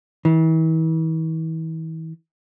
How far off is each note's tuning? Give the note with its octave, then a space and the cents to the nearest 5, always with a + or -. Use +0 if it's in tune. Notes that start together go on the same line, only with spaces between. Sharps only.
E3 -40